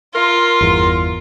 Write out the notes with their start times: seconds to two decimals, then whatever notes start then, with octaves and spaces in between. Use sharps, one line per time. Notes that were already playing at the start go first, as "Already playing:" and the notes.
0.15 F4 A#4 C6
0.61 G1 E2